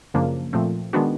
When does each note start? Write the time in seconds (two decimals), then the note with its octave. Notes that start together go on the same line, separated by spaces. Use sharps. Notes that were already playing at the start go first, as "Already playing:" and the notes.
0.14 F#2 C#3 F3 A#3 D4
0.53 A#2 F3 A3 C4
0.93 D#3 G#3 B3 D4 F#4